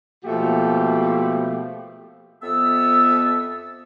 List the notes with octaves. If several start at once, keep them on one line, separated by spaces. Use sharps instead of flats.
B2 F3 A3 A#3 F#4 G4
F2 B3 A4 E5 E6